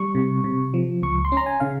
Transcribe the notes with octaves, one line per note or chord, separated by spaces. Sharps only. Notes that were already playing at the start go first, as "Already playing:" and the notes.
Already playing: G3 C#6
C3
C3
F3
C#2 C#6
C6
C#4
A#5
G#5
C#3 F5